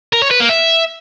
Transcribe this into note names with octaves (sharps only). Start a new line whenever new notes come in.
A#4
C#5
B4
A#3
E5